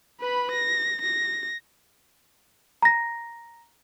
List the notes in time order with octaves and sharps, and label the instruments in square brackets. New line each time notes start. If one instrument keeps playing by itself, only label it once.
[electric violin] B4 B5
A#6
A#6
[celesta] A#5 A#6